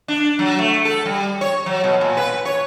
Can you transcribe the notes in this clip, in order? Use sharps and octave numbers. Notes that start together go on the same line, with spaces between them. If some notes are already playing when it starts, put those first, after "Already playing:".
D4
F#3
A3
A4
G3
C#5
F#3
B2
A#2
B4
C#5